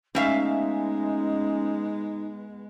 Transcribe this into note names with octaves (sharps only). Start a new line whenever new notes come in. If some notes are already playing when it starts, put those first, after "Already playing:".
G#3 A3 B3 C#4 D#4 E5 F5